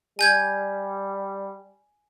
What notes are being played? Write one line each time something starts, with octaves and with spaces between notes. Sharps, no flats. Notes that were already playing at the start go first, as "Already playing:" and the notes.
G3 G#5 G6 G#6